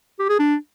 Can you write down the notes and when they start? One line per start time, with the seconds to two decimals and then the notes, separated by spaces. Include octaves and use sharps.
0.19 G4
0.29 G#4
0.39 D4